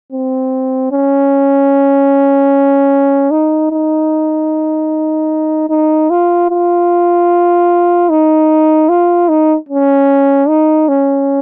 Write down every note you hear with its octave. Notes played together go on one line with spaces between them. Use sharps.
C4
C#4
D#4
D#4
D#4
F4
F4
D#4
F4
D#4
C#4
D#4
C#4